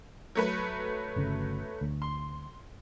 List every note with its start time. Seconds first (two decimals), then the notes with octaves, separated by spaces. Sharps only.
0.35 F#3 A3 B4
1.16 G1 C#3
1.81 D2
2.02 C6